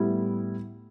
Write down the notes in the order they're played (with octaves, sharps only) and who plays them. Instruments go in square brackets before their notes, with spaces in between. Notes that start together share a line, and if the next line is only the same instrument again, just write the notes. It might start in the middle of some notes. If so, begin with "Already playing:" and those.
Already playing: [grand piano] A2 G3 B3 E4